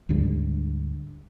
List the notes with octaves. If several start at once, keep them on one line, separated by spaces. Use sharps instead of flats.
D2 G#2 D3 G3